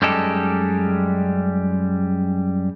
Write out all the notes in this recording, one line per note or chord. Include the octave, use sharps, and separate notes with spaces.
F#2 G3 G#3 D#4 G4 A4